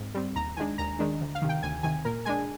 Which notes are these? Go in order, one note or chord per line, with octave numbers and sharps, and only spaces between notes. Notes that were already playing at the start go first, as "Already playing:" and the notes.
Already playing: G#2 C4
G3 C4
D#2 A#5
D#3 G#3 D4 G#5
D#2 A#5
D#3 G#3 D4
D2
F5
C3 D#3
G5
D2 G#5
C3 D#3 G#5
A#2 A#4
G#3 D4 G#5